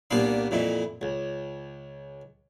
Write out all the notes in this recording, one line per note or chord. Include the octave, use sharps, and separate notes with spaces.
C2 A#2 A#3 B3 D4 C6
F2 A#2 E3 E4
C#2